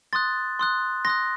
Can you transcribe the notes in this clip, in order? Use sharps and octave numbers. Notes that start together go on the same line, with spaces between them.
C6 D#6 F#6 A6
C6 D#6 F#6
C6 D#6 F#6 A#6